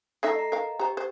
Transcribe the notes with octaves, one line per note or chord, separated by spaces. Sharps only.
A3 D#4 A4 E5 A#6 C7
D#5 A#5
A#4 F5
G4 C5 A#5
C5